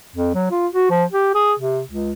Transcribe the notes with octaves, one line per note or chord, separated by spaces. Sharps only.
F2
F#3
F4
F#4
F3
G4
G#4
C3
C#2